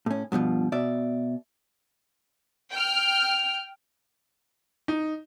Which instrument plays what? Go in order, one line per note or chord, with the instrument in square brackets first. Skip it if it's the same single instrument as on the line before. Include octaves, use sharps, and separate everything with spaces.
[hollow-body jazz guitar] A2 C#4
G2 B2 D3 F3
B2 D5 E5
[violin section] G5 F6
[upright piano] D#4